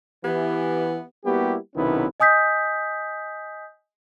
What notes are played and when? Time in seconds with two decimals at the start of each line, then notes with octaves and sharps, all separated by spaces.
0.24 E3 B3 G4
1.25 G3 A#3 B3 E4 F#4 G4
1.75 B1 C3 D#3 B3 C#4 E4
2.20 D#5 G#5 D#6 G6 B6